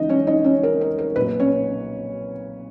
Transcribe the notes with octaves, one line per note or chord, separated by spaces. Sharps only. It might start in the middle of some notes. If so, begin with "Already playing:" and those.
Already playing: C#2 C#3 E3 D#4 D#5
C#4 C#5
D#4 D#5
C#4 C#5
A#4
A#4
A#4
B1 A#2 B4
C#4 C#5